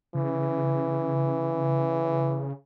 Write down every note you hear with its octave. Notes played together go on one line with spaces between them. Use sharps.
C#3 E3